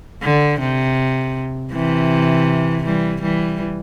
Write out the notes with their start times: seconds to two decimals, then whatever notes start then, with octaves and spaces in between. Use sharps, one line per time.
0.23 D3
0.60 C3
1.72 C3 E3
2.85 E3 G3
3.22 E3 G3